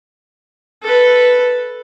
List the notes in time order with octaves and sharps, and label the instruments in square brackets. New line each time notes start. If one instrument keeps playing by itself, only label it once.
[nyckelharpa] A4 B4